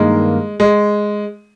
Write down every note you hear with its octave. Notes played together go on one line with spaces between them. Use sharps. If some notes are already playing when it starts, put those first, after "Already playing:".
Already playing: G2 D#3 G#3 A#3
G#3